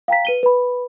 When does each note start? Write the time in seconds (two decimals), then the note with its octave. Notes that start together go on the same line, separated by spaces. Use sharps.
0.08 F5 G5 A#5 B6
0.25 B4 D#7 G7
0.43 B4 B5